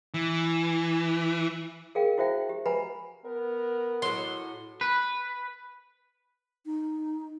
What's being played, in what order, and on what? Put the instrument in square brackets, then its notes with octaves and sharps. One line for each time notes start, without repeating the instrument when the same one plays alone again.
[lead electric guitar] E3
[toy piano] G#4 A#4 F5 G5
E4 F#4 C5 E5 G5
G4
B4 F#5 G#5 A#5 B5
[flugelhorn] B3 [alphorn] A#4
[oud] A2 F#3 [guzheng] C6
[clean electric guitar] B4
[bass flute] D#4